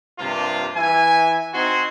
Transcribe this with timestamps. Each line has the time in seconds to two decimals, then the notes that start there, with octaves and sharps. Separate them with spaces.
0.19 G2 C3 F3 A#3 F4
0.76 E3 E5 G#5
1.54 C4 D#4 F#4 G#5 C6